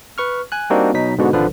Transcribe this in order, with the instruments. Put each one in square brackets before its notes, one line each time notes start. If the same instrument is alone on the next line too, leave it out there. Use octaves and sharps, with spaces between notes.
[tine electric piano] B4 C#6 F6
G#5 F#6
G3 A#3 C4 D4 D#4 F#4
B2 F#3 D#4 B6
G#2 B2 D3 F#4
G#1 D3 F3 B4